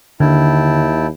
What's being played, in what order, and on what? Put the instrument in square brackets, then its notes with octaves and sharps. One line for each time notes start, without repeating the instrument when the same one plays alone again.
[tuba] D#2 [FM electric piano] D3 [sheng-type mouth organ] E4 G5 A5